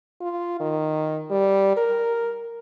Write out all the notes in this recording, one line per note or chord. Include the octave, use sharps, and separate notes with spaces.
F4
D#3
G3
A#4